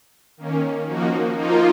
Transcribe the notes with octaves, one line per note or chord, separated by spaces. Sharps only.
D#3 A#3 C#4
F3 A#3 D#4 F#4
F3 A#3 D#4 F4